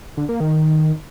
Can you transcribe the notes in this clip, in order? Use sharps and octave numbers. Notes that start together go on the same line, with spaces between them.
D3
A#3
D#3